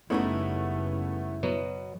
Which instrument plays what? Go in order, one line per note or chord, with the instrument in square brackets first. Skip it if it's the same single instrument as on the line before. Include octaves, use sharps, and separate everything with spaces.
[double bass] F#1 [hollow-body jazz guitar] G3 D#4 E4 [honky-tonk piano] A3 B3 C#4
[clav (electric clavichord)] B2 F#3 B3